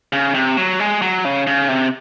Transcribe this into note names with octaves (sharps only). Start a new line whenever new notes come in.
C#3
C3
F#3
G#3
F#3
C#3
C#3
C3